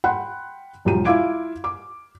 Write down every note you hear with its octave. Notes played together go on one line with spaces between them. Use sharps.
F#5 G5 B5 C6 F#6
E1 B1 F3 G4 A#5 D#7
E4 F4 F5 D6 G#6 D7
D6